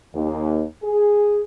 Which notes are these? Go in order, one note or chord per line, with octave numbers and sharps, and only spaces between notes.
D#2
G#4